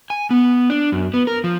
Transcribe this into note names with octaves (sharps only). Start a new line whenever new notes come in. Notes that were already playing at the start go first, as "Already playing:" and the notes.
G#5
B3
D4
F#2
B3
A#4
F3